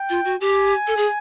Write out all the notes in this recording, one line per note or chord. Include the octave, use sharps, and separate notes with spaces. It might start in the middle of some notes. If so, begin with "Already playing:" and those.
Already playing: G5
F4
F#4
G4 G#5
A4
G#4